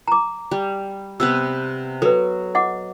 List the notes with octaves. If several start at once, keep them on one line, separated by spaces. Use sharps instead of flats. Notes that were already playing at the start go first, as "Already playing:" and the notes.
A#5 D6
G3
C3 B3 B4 E6
F#3 A4 B4
D#5 F#5 D6